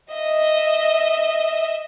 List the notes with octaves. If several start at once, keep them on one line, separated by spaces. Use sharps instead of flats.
D#5 E5